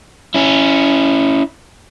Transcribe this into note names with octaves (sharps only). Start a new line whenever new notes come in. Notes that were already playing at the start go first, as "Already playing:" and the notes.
C#4 E4